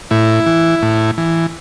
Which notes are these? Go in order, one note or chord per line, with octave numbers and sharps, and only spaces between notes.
A2 E4
E3
A2
E3